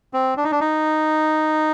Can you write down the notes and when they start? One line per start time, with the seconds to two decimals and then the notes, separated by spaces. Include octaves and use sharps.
0.13 C4
0.37 D4
0.44 D#4
0.52 D4
0.61 D#4